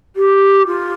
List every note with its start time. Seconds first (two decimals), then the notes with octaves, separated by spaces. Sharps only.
0.16 G4
0.67 F4